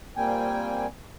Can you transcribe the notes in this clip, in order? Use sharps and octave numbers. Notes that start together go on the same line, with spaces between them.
A#2 G3 A#3 C4 G5 G#5